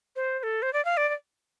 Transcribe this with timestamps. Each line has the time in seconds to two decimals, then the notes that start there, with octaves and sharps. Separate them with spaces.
0.16 C5
0.39 C5
0.43 A4
0.62 C5
0.73 D5
0.85 F5
0.97 D5
1.09 D5